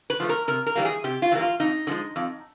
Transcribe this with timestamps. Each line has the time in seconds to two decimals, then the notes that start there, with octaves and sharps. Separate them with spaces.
0.10 B4
0.20 F3 A3
0.29 A#4
0.48 C3 A#4
0.66 A#4
0.75 E3 G3 A#3
0.85 G#4
1.04 C3 G4
1.22 F4
1.32 E3 G3 A#3
1.41 F4
1.60 F2 D#4
1.87 D3 F3 G#3
2.16 F2